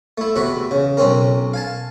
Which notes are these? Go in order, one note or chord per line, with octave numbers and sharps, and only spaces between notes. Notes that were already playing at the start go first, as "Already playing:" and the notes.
A3 E4
E2 C3 F#4 F#5 B5
C#3
B1 C4 C#4 A#4
F5 G#5 A5